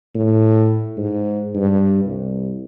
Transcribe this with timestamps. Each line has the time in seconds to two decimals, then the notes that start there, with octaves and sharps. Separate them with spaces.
0.15 A2
0.97 G#2
1.55 G2
2.04 C2